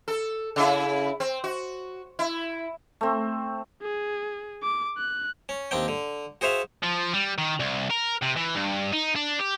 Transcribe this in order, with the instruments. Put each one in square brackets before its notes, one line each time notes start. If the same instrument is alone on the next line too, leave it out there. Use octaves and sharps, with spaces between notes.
[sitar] A4
C#3 E4
C4
F#4
E4
[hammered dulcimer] A3 C4
[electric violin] G#4
D6
F#6
[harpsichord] C#4
D#2 C4 D4 G5
D3
F#4 G#4 C5 E5 F5
[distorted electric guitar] F3
G3
D#3
C2
A#4
C3
E3
G2
D#4
D4
G4